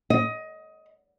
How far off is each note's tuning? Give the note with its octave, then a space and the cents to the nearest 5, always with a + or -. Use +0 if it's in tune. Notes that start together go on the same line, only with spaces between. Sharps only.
D#5 +20